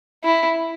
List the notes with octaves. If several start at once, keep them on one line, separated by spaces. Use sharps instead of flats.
E4